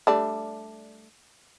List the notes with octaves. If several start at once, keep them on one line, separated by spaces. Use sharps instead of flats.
G3 A3 D4